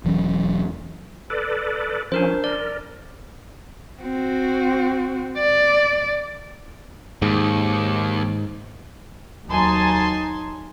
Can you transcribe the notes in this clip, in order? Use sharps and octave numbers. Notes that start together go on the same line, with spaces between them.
E1 E3 F#3 C#4
A4 B4 D5
F3 C#4 D4 A#4 C5
A#4 D5
C4 F#4
D5
D#2 G#2
D#2 F#3 D#4 G#5 A5 C6